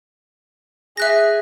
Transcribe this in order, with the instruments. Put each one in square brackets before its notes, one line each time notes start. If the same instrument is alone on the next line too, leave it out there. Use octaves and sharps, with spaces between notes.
[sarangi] G#4 [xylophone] E5 F#6 A#6